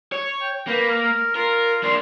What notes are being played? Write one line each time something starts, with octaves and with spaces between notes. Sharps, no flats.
C#5
G5
A#3 B4
A#4
F4 A#4
A#3 D4 C6